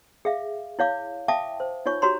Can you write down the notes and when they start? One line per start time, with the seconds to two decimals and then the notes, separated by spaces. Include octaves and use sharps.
0.25 G#4 E5 F5
0.79 E4 C#5 F5 D6
1.28 E5 F5 G5 A5 D6 D#6
1.60 C5
1.86 D#4 F4 C#5 C#6
2.02 F#4 G4 C#5 A#5 C6